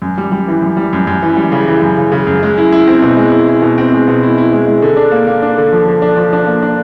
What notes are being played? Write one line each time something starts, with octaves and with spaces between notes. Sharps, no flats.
F#2
G3
G3
E3
F#2
G3
F#2
F#2
E3
G3
C#3
E3
F#2
C#3
C#3
F#2
G#3
E4
E4
C4
B2
G#3
E4
E4
B2
C4
G#3
B2
E4
E4
G#3
G#3
D3
D4
A#3
A#3
D4
D3
F3
D3
D4
F3
D4
A#3
D4